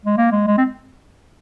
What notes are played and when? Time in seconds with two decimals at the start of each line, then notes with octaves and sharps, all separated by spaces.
0.05 G#3
0.18 A#3
0.32 G#3
0.47 G#3
0.58 C4